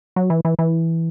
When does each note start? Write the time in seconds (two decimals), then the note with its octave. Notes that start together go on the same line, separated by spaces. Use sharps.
0.16 F#3
0.30 E3
0.45 E3
0.59 E3